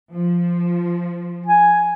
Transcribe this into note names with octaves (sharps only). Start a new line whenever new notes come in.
F3
G#5